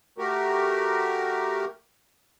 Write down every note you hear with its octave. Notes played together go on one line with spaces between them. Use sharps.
A3 F#4 G4 A#4